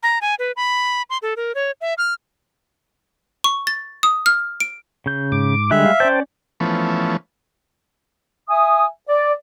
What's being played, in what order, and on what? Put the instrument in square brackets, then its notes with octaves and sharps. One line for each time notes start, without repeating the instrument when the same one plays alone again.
[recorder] A#5
G#5
B4
B5
C6
A4
A#4
C#5
E5
F6
[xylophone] C#6
A6
D#6
F6
D7
[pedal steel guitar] C#3 G6
[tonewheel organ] G#2 D6
[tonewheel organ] D3 [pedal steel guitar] G3 G#3 F#6 [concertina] E5
[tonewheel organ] F5
[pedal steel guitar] C#4 D5 G6 [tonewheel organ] C5 G5 A5
[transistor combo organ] E3 F3 A3 B3 C#4
[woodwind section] E5 G#5 D#6
D5